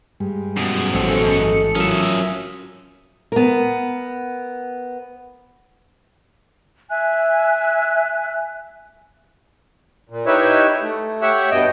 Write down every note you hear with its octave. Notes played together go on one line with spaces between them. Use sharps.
G2 G3 G#3
F#2 B2 G#4
A1 G4 A4 C5 C#7
G#2 D#5
F#3 C#4 F4 A#4 E5 D#6
B3 A#4
E5 G#5 F#6
A#2
D#4 E4 G4 B4 C#5 E5
A3
G4 C#5 E5 F#5
G2 B2 D#5 G5